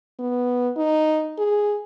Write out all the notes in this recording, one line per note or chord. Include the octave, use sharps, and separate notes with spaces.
B3
D#4
G#4